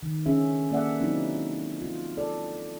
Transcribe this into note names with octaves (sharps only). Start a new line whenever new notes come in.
D#3
D3 C#4 G#4 E5
A#3 A4 D5 E5 F#5
F#3 C4 D#4 E4
F4
A4 D5